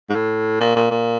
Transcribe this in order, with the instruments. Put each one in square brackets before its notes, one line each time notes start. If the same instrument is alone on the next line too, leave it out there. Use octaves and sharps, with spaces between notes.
[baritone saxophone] G#2
A2
A#2
A#2
A#2